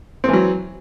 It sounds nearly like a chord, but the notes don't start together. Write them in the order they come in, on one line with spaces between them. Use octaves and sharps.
C4 E3 F#3